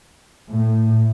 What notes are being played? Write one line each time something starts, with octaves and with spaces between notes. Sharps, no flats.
A2